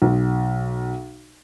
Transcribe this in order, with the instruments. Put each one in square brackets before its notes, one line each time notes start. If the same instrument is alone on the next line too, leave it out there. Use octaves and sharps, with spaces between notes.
[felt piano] B1